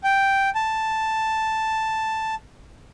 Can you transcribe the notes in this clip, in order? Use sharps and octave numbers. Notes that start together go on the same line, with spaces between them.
G5
A5